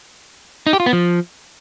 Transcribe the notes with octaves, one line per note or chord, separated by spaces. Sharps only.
D#4
G4
F4
B3
F3